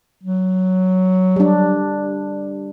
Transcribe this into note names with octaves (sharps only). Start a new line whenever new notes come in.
F#3
G3 D4